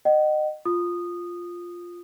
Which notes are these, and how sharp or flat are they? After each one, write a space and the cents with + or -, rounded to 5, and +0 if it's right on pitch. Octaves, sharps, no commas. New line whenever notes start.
D#5 -25 F#5 +40
F4 +0 D#6 -15